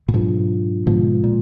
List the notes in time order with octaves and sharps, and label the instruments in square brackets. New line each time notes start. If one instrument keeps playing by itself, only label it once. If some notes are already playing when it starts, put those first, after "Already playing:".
[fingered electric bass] A#2
[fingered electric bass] G#2 B2 [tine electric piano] F#3 D4 F4
[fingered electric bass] G#2 B2 [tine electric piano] D3 F3 G#3 B3 F4
[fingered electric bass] A#2